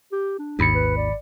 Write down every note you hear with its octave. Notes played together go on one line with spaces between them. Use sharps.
G4
D4
G#1 D#2 B5 C#7
B4
D5